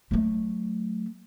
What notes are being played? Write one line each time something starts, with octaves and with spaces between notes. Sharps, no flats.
F#3 A3